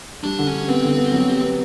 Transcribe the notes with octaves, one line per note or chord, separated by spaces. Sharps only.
G3 D4
D3
C#4
G3
B3 C4
D3
B3
F#3
G4
B3